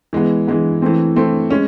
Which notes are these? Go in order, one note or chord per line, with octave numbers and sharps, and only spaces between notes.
E3 G#3 B3
E3 G#3 B3
E3 A3 C4
E3 A3 C4
G#3 C#4